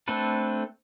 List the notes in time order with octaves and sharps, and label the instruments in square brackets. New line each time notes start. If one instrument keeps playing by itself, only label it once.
[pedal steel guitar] A3 C4 D4 A4 B4